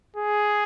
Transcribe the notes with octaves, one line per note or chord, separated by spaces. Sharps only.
G#4